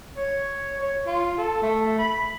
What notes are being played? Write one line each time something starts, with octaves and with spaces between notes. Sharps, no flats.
C#5
C#5
F4
A4
A3
B5